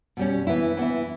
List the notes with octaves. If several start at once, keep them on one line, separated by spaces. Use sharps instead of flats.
B2 G3 C#4
E3 B3 E4
E3 B3 E4